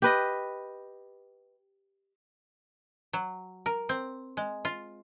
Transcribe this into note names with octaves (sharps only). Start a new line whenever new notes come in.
G4 B4 D#5
F#3
A#4
C4
G#3
F4